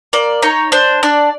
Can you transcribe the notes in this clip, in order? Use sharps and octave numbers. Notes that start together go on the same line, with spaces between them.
A#3 D5
D#4 C#5
D4 C5
D4 D5